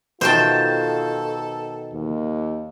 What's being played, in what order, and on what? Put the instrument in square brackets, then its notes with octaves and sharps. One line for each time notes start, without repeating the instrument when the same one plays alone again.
[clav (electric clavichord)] B2 D#3 [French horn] F4 [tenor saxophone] A4 [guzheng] C5 G5 A5
[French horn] D#2